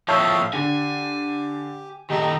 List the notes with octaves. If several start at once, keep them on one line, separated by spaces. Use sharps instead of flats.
A2 F3 C#5 E5 F5 A5 D#6 G6
D3 G4 G#5
D#3 A3 D#4 G4